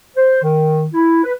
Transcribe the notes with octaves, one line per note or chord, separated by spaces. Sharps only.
C5
D#3
E4
B4